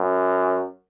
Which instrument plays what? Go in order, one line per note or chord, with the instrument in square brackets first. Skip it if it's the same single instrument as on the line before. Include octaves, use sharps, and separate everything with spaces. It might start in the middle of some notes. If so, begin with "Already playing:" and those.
Already playing: [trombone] F#2